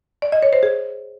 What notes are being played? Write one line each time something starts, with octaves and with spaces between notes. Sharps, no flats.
D5
D#5
C#5
C5
G#4